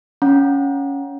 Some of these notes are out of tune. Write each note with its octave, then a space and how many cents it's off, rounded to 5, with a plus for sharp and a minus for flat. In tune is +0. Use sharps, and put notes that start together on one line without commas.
C#4 +5 F#5 -30 A#5 +20